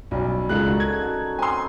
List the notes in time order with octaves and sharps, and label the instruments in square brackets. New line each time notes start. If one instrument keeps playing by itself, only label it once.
[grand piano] B1 [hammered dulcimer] G3 C#4
[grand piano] C#2 G#3 F#6 [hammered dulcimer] D#4 A4 A#4
[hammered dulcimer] F#4
[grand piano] G#6
[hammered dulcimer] F#4
[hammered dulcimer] C4 [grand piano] G#5 C6